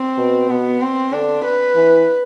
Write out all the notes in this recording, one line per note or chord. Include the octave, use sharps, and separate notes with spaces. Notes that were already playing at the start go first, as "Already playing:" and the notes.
Already playing: C4
B2
B2 B3
C4
D3 D4
B4
E3